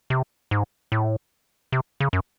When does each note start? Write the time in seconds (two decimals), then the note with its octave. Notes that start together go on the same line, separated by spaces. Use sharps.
0.10 C3
0.51 G#2
0.92 A2
1.72 C3
2.00 C#3
2.13 F#2